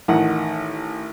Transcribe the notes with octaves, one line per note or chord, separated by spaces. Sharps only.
A1 D#3 F#5